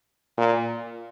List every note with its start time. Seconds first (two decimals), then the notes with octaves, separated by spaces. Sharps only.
0.38 A#2